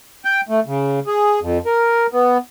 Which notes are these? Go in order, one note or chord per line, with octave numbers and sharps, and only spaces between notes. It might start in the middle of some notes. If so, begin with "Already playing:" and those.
G5
A3
C#3
G#4
F2
A#4
B3